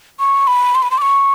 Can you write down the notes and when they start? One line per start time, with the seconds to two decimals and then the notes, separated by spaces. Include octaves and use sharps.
0.19 C#6
0.47 B5
0.75 C6
0.82 B5
0.91 C6
0.98 D6
1.02 C#6